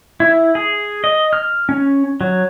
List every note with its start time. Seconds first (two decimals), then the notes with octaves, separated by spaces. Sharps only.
0.20 E4
0.55 G#4
1.04 D#5
1.33 F6
1.69 C#4
2.21 F#3